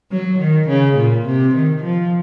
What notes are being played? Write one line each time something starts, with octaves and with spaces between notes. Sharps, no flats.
F#3
D#3
C#3
A#2
C3
D#3
F3